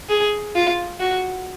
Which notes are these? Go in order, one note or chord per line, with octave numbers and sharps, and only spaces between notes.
G#4
F4
F#4